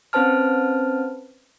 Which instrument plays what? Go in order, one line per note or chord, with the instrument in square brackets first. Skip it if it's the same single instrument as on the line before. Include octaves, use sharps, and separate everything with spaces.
[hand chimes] C4 C#4 B4 C5 A5 F6